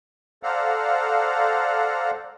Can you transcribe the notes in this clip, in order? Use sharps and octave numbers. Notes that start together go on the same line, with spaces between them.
A4 C5 D5 F5 F#5 A#5